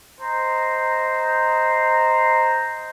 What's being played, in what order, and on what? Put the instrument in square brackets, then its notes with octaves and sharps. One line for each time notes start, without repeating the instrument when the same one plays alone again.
[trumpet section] C5 D#5 A#5